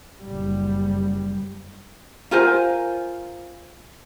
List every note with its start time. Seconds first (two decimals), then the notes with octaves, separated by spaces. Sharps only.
0.24 F#1 G3
2.31 F4 A#4 C5 G#5